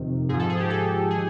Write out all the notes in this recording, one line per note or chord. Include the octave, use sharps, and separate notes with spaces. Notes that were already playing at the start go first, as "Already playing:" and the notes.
Already playing: F2 C3 D#3
G#2 F3 G#4
A4
G#4
G4
A4
D#3 G#4